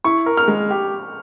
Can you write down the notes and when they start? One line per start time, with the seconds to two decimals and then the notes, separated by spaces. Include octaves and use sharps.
0.04 E4 C#6
0.26 A#4
0.37 F6
0.48 G#3
0.70 G4